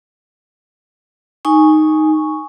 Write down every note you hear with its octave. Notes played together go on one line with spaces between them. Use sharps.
D#4 G#5 C#6